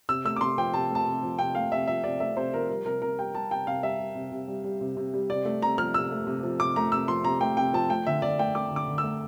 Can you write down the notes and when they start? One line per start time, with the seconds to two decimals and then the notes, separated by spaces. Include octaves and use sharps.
0.09 C3 E6
0.25 A3 E6
0.36 D6
0.41 C3 C6
0.58 F3 G5
0.73 C3 A5
0.90 A3 A5
1.06 C3
1.23 F3
1.39 C3 G5
1.55 A3 F5
1.72 C3 E5
1.87 F3 E5
2.04 C3 D5
2.20 A3 E5
2.37 C3 C5
2.53 F3 A#4
2.69 G3 A#4
2.85 C3 A#4
3.02 C3 A#4
3.19 G3 G5
3.34 G3 A5
3.51 C3 G5
3.67 C3 F5
3.83 G3 E5
3.99 G3
4.15 C3
4.32 C3
4.48 G3
4.64 G3
4.81 C3
4.97 C3
5.14 G3
5.30 C3 D5
5.45 A3
5.62 C3 A#5
5.78 F3 F6
5.94 C3 E6
6.12 A3
6.27 C3
6.43 F3
6.60 C3 D6
6.76 A3 A#5
6.92 C3 E6
7.08 F3 C6
7.24 C3 A#5
7.41 A3 G5
7.57 C3 G5
7.74 F3 A5
7.90 A3 G5
8.07 D3 E5
8.22 D3 D5
8.39 A3 G5
8.55 A3 D6
8.71 D3
8.76 D6
8.88 D3
8.98 E6
9.03 A3